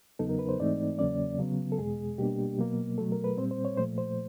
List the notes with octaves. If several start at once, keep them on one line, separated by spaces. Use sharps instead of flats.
E2 C#3 F#3 B3 D#4 A4
A#4
B4
C5
G#2 E3 A3 C4 D#4 D5
E2 C#3 F#3 A#3 C#4 D5
C#3 F#3 B3
A4
E2 B2 G#3 G#4
B2 G3 A#3 D4 G4
B2 F#3 A#3
B2 F#3 A3 A4
A#4
B4
A#2 G3 C4 C5
C5
C#5
A#2 F3 A3 C5
C5